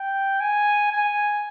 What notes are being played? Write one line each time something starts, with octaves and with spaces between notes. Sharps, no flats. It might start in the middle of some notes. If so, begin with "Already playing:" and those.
Already playing: G5
G#5
G#5